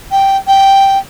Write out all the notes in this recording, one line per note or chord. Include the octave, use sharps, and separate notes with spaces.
G5
G5